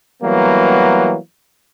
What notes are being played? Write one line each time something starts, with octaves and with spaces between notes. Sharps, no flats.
E3 F#3 G3 A#3 B3